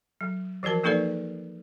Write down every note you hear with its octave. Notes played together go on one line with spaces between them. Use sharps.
F#3
E3 F3 F#4 A#4 A5
F3 A#3 D#4 A4 B4 D5